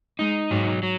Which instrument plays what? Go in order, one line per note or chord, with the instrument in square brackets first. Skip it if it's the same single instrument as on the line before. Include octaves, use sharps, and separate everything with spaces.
[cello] G#3 [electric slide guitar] D#4
[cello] G#2 [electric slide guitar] F#3
[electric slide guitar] F#3